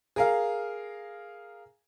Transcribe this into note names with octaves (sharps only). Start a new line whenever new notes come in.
G#4 A#4 F5